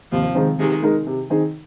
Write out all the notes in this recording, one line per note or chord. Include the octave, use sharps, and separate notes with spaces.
D#2 C3 F3
D#3 G#3 C4
C3 D#3 G#3
G#3 D#4 A#4
C3
D#3 C4 D#4 G#4